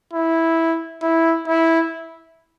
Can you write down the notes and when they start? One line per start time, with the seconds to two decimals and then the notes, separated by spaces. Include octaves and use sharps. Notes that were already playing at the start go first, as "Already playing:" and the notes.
0.13 E4
1.02 E4
1.48 E4